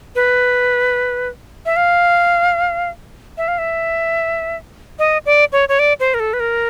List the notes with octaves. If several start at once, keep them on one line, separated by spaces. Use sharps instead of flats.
B4
E5
F5
E5
F5
E5
D#5
D5
C#5
C#5
D5
C5
A#4
A4
B4
A#4